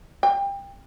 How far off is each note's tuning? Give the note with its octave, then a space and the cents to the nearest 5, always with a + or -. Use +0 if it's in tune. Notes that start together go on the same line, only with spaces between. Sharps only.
G5 +25